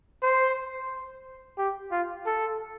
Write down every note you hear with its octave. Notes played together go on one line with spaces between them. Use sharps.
C5
G4
F4
A4